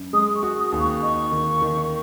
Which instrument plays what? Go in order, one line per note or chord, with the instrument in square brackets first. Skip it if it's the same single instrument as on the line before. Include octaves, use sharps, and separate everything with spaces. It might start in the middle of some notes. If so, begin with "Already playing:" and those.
Already playing: [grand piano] F#2
[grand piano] G#3 [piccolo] D#6
[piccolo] C#6
[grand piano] F#4
[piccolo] D#6
[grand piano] D#2
[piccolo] C#6
[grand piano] D#4 [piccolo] C#6
[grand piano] D#3
D#3